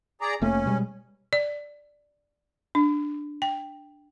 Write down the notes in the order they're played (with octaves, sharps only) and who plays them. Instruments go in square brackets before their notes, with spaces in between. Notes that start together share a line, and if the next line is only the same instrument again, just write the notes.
[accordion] G#4 D5 A#5
[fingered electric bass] F1 A3 A#3 [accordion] C#4
[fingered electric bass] B2 G3 G#3
[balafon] D5
D4
G5